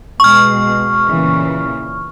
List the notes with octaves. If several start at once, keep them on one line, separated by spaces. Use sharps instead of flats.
B2 G#3 C#6 F6
A#2 C#3 E3